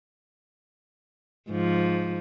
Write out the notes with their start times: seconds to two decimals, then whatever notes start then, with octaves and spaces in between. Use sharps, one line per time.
1.49 G#2 F3